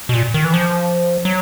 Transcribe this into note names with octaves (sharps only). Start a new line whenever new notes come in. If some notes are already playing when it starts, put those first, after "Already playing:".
B2
A#2
D#3
E3
F3
F#3